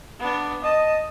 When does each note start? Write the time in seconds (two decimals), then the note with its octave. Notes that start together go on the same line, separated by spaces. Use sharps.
0.19 B3 D4
0.64 D#5 A5